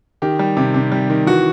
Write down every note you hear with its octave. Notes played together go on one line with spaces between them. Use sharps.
D#3 G4
G3
C3
C3
G3
D#3
E3 F#4